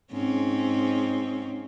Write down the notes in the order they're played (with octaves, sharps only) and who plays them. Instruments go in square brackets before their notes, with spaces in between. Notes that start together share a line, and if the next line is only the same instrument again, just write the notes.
[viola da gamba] G#2 C4 C#4